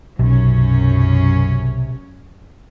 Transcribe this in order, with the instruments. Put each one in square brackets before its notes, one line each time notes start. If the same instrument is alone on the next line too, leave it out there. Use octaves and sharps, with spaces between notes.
[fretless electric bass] B1 [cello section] F#2 C#4 [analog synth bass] C3